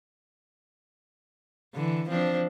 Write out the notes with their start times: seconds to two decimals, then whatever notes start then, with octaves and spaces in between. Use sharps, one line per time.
1.74 D3 E3
2.09 F3 C4 D4